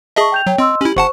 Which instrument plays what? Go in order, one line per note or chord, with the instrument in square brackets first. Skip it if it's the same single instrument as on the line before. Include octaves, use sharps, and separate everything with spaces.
[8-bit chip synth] G#4 D#5 E5 [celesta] A5 C#6
[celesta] G5 G6 F7
[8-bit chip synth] F#3 [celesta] C#5 G5
[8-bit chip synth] C4 [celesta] D#5 C6 E6
[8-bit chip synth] C#4 E4 [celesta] G4 F#7
[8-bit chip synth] G1 F#5 A5 [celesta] C5 C#6